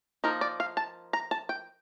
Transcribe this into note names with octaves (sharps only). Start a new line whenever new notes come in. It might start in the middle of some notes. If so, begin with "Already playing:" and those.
F3 A#3 D#4 A#4
D5
F5
A5
A#5
A5
G5